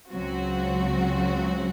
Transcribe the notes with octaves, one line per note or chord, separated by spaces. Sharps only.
C#2 C#3 F#3 C4 F#4